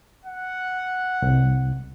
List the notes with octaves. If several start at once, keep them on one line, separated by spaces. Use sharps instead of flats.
F#5
C2